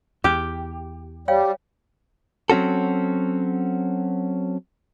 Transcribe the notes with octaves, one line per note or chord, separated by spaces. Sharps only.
E2 G4
G3 C#5 F5 G5
F#3 C4 C#4 F#4 A4